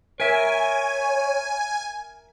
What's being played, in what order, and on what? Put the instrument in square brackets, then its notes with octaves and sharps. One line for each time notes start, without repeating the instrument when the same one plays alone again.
[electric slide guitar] A#4 E5 [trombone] C#5 [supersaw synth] G#5